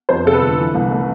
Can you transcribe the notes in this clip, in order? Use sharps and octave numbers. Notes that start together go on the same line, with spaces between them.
F2 C5
C3 A4
B4
G1
E3
C2
A3